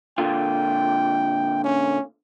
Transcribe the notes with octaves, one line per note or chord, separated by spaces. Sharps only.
A#2 D3 F4 G5
C#4